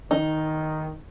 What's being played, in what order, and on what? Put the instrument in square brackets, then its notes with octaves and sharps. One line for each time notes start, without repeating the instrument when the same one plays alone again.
[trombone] D#3 [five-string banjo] D#4